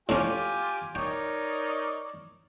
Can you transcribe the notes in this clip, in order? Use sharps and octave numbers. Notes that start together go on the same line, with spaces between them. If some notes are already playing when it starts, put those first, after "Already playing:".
A2 C#4 F4 G4 G#5
D#4 A#4 C#5 D5 G5